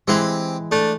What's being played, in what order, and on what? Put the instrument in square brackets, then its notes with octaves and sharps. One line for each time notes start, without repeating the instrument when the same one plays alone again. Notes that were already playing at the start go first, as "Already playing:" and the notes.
[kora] E3 G#3 [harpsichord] C4 G4 G#5
[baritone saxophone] A3 [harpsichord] D4